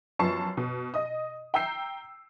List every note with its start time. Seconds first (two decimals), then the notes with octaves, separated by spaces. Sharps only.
0.19 F#2 F3 B3 A5 C#6 C7
0.57 B2
0.94 D#5 D#6
1.54 G5 A#5 E6 G6 C7